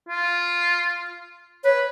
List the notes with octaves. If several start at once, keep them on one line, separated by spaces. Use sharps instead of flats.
F4
B4 C#5